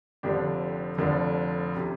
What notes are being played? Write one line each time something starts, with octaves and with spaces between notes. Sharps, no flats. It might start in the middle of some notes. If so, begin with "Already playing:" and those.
F1 F2 D3 D4 G4
F1 F2 D3
C3